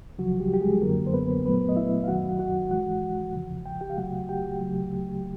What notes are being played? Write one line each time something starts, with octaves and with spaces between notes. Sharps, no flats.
D2 C#3 F3 F#3 F#4
G3 G4
G4
G#3 G#4
F#2 D3 F#3 A#3 A#4
C5
B3 B4
A#2 F#3 A3 B3 B4
D#5
E4 E5
F5
F#2 D#3 F#3 F#4 F#5
F#4 F#5
G#2 E3 G#3 F#4 F#5
E2 C#3 F3
G5
G4 G5
F5
D2 C#3 F#3 A3 F#4 F#5
G4 G5
D2 C#3 F#3 A3